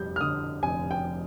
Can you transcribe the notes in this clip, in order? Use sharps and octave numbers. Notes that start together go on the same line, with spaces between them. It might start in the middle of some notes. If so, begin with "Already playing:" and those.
Already playing: F1 G3 G6
F6
D3 D#6
F1 G#5
G5